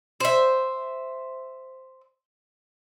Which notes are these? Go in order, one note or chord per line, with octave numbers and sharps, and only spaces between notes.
C5 E5